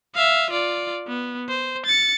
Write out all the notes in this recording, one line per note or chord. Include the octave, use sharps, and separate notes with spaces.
E5 F5
F4 D5
B3
C5
A6 C#7